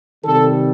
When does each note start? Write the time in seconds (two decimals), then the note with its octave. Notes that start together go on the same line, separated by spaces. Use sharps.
0.25 C3 D#3 G3 A4